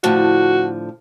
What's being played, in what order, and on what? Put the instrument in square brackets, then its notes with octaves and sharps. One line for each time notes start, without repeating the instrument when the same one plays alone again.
[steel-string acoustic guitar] A2 D3 F3 [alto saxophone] F#4